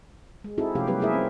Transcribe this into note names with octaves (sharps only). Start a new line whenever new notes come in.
G#3
C4 D#4 E4 F#4 G#4 A4
C3 F3 A3 C#4 G4 F5
F#3 G3 B3 C#4 G4 B4
A3 A#3 E4 G#4 A#4 E5
C4